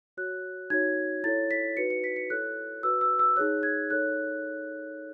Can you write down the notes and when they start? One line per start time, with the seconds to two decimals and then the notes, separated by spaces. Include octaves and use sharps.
0.17 F#4 C#5 F#6
0.70 D#4 F#4 C#5 G#6
1.24 E4 A4 C#5 A6
1.51 B6
1.77 D#4 F#4 B4 C#7
1.90 C#7
2.04 B6
2.16 C#7
2.30 E4 A4 C#5 F#6
2.83 F#4 B4 E6
3.01 E6
3.19 E6
3.37 D#4 G#4 C#5 F#6
3.63 G#6
3.90 D#4 A4 C#5 F#6